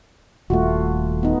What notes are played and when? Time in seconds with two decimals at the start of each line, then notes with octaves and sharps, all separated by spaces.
0.50 D#1 A3 F4 F#4
1.23 B3 D#4